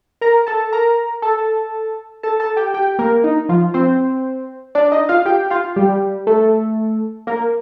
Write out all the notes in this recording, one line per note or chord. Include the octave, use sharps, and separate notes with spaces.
A#4 A#5
A4 A5
A#4 A#5
A4 A5
A4 A5
A4 A5
G4 G5
G4 G5
A#3 A#4
D#4
F3 F4
C4 C5
D4 D5
D#4 D#5
F4 F5
G4 G5
F4 F5
G3 G4
A3 A4
A#3 A#4